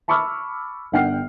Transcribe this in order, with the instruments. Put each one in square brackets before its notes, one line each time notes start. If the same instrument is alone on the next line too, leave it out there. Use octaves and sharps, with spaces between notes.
[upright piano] A5 B5 C#6 D6 E6 F6
G1 D4 F#5 G5 F6 C7